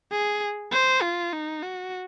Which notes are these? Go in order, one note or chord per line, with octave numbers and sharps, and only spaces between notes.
G#4
C5
F4
D#4
F#4